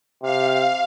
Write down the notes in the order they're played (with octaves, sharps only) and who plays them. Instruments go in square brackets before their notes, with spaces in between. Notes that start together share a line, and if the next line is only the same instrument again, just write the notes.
[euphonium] C3 [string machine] F5